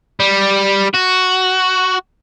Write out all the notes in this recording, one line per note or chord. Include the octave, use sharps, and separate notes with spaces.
G3
F#4